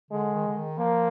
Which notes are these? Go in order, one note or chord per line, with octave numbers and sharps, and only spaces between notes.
D3 G#3
D#3
D3
D#3
F3 A#3